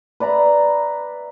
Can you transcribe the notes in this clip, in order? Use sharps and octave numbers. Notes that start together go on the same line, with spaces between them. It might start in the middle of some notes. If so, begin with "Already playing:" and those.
B4 D5 E5 A#5